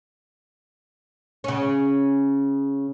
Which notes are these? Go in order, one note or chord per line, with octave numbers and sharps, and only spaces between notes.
C#3 C#4